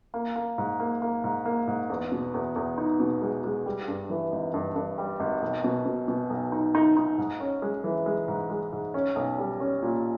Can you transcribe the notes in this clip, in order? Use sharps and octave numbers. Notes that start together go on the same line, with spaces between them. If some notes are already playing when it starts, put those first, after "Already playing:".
A#3
A#3
G#2
A#3
A#3
G#2
A#3
G#2
E2
B2
E2
E2
D#4
B2
G#3
G#3
G3
G2
E3
G#1
G2
G2
G3
G#1
B1
B2
B2
B2
B1
D#4
D#4
D#4
G#2
C#4
G#3
E3
G#3
G#2
G#3
G#2
C#4
B1
G3
C#4
A#2